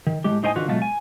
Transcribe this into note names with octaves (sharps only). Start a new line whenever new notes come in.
D#3
A2 G#3 G4
A2 D#4 C5 D#5 G5 G#5
D3 D#3 F4 F#4 B4
B2 F#3 G#3 A3 F4
G#5